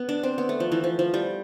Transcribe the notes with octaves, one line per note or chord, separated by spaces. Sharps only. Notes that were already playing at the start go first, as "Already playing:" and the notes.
Already playing: B3
D4
C4
B3
A3
F3
E3
F3
F3
G3